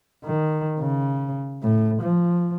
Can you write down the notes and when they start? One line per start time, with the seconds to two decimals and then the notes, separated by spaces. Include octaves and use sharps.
0.25 D#3
0.80 C#3
1.63 A2
2.02 F3